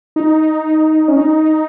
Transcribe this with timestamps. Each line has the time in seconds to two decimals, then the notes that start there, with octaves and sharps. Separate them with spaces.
0.16 D#4
1.08 C#4
1.17 D#4